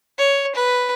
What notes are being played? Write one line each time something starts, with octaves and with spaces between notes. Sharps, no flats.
C#5
B4